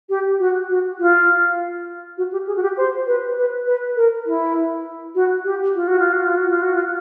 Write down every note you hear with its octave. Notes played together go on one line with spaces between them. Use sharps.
G4
F#4
F#4
F4
F#4
G4
G#4
F#4
G4
C5
B4
B4
B4
A#4
E4
F#4
G4
F4
F#4
F4
F#4
F4
F#4
F4
F#4
F4